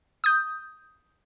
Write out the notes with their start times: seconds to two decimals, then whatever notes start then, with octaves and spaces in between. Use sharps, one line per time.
0.24 D#6 G6